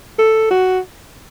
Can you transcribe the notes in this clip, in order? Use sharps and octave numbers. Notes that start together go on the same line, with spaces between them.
A4
F#4